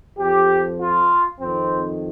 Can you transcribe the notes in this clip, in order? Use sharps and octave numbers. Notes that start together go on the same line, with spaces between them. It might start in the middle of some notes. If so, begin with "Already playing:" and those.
F2 F3 G4
F4
F2 D#3 C4